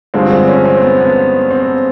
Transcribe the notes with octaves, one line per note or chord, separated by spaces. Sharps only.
G2 D3 F3 G#3 C4
C4
C#4
C4
B3
B3
C4